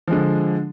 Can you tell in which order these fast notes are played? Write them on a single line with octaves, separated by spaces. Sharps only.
F3 G#3 D3